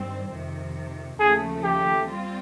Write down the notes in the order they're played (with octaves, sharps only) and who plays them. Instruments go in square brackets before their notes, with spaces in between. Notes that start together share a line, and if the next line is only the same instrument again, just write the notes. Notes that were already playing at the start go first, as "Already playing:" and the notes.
Already playing: [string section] G2 D#3 G3 C4
F2 C3 D#3
[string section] D#2 C#3 F3 A3 [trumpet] G#4
[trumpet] G4
[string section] G3 C4 F4